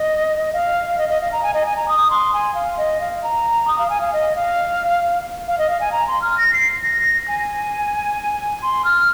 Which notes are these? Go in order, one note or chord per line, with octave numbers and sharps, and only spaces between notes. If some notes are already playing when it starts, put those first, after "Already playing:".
Already playing: D#5
F5
D#5
D#5
F5
A#5
G#5
D#5
G#5
A#5
D#6
C6
G#5
F5
D#5
F5
A#5
D#6
F5
G#5
F5
D#5
F5
F5
D#5
F5
G#5
A#5
C6
F6
A#6
C7
A#6
G#5
C6
F6